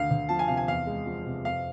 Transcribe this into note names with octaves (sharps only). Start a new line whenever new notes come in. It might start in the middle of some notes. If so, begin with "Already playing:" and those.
Already playing: D2 F5
D2
F3 A5
G#5
C3 F5
G#5
E2 F5
G#3
F3
C3
F2 F5